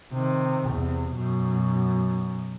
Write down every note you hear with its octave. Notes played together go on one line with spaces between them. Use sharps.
C3 D#3
E2 C3
F#2 B2